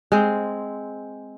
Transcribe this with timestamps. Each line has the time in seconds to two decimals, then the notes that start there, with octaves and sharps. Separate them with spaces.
0.12 G#3 C4